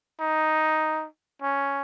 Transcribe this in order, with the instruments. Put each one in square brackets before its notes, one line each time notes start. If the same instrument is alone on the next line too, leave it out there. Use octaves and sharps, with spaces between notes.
[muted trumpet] D#4
C#4